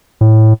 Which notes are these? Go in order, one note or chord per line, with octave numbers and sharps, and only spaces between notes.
A2